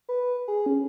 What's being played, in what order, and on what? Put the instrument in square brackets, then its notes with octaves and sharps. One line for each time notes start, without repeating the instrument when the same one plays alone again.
[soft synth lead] B4
G#4
C#4